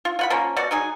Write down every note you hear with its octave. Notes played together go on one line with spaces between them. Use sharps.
F4
F4 F#5 B5
F3 A#3 C#4
B2 F#4 D5
F#3 D#4 G#4